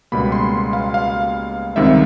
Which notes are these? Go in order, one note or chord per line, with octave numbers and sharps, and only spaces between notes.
C#2 B2 G3 A#3 B5
C6
F5
F5
C#2 C3 D#3 G3 C4 E5